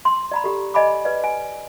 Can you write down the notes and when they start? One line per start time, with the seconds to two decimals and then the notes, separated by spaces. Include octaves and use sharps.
0.05 C6
0.32 D5 A#5 B5
0.44 G4 A4
0.74 D5 D#5 G#5 B5 D6
1.05 B4 D5
1.24 G#5